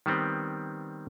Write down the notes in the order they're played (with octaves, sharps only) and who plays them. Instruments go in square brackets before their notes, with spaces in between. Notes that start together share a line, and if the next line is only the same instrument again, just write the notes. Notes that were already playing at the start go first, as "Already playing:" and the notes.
[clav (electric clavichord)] D#3 G3 B3 C4